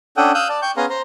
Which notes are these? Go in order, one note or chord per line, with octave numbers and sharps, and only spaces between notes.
C#4 D4 A4 F#5 G5 D#6
F5 D#6 E6 F#6 G6
D5 A5
G5 C#6 G6
B3 C#4 G#4 F5 A#5 C6
C5 A#5 C6